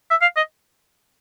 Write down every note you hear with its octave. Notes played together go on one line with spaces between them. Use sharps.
E5
F5
D#5